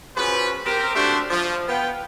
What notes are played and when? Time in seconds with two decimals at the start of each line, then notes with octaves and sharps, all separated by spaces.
0.15 F3 C#4 F#4 G#4 B4
0.65 C4 G4 A#4
0.95 A3 D4 F#4 G4 C5 E5
1.30 F3
1.68 B3 F5 G5